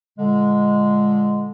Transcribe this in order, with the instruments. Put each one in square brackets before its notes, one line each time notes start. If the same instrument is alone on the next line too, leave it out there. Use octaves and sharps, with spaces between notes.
[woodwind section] A#2 D3 G#3